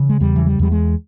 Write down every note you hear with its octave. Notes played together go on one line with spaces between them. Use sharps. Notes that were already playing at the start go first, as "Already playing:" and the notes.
Already playing: C#3 E3
G#3
E2 G3
E3
G3
E2 G3
G#3